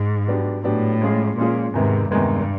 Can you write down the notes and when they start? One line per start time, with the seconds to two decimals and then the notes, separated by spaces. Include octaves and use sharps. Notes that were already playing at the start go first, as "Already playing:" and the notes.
Already playing: G#2
0.27 F#3 B3 D4 G4
0.64 A2 F#3 B3 D4 G4
1.01 F3 G#3 C#4 F4 G#4
1.37 A#2 F3 G#3 C#4 F4 G#4
1.74 E2 G#2 C3 D#3 G#3 B3
2.10 E2 G2 C3 D#3 G#3 B3